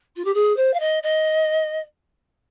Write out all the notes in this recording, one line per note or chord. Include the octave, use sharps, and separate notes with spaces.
F4
G4
G#4
C5
F5
D#5
D#5